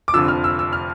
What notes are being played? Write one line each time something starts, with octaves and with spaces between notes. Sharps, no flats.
D6
F1 F2 D3 F3 E6
F6
E6
E6
F6